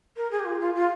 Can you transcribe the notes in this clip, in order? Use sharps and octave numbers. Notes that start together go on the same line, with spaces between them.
A#4
G#4
G4
F4
F4
F4